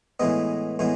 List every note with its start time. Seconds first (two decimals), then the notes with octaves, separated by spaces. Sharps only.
0.19 A2 E3 G#3 B3 D#5
0.79 A2 E3 G#3 B3